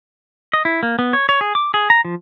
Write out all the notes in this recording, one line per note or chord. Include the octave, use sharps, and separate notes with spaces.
D#5
E4
A#3
B3
C#5
C#5
G#4
D6
G#4
A#5
F3